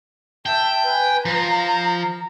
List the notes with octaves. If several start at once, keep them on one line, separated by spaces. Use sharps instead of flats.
E5 G5 A5
B4 G#5
F3 A#5